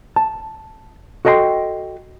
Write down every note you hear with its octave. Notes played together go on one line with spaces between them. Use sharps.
A5
F#4 A4 D#5 G5 G#5 C6